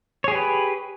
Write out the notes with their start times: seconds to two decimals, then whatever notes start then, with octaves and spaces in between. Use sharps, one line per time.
0.24 C#5
0.28 G#4
0.32 G4
0.35 B4